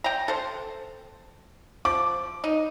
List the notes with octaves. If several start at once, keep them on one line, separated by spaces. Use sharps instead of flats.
G5 A#5
A4 C5
F3 D6
D#4